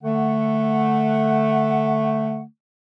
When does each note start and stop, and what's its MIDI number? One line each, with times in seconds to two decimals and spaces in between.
0.03 2.42 50
0.03 2.42 57
0.03 2.42 78